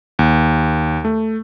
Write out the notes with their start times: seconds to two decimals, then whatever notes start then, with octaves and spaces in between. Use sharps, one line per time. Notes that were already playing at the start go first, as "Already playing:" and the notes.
0.19 D#2
1.05 A3